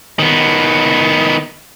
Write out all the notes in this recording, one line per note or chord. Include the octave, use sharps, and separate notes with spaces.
D#3 B3